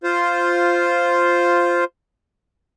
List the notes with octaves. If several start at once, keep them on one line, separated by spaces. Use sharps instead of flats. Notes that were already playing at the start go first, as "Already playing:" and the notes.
F4 C5